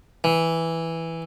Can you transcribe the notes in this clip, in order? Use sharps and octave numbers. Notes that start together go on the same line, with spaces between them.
E3